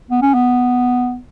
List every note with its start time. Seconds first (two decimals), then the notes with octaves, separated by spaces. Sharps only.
0.11 B3
0.22 C#4
0.34 B3